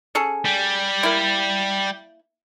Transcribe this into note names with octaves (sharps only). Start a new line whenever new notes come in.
C#4 G#4 A4
G3
A#3 E4